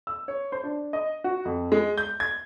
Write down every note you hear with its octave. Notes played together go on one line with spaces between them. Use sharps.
E6
C#5
C5
D4
D#5
F#4
F2
G#3
G6
G#6